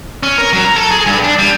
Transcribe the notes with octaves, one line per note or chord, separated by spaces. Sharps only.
C#4
A#4
F#3
A#5
A4
G#4
G2
D4
G3